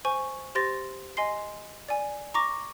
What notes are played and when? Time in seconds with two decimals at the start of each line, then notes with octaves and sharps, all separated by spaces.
0.05 C5 G#5 C#6
0.55 G4 C5 C6 A6 A#6
1.17 D#5 G#5 C6 C7
1.89 D5 G#5
2.34 A#5 C#6 D6 A#6